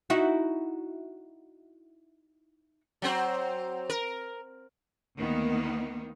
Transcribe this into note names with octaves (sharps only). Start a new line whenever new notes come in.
D#4 E4 F#4
F#3 C4 C5
A#4
D2 D#3 A#3 B3 D#4